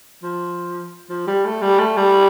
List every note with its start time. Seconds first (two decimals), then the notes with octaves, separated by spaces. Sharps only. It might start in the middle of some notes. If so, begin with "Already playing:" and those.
0.23 F3
1.09 F3
1.27 G3
1.45 A3
1.62 G3
1.79 A3
1.97 G3